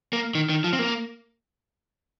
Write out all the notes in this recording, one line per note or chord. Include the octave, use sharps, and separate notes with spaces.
A#3
D#3
D#3
F3
C4
A#3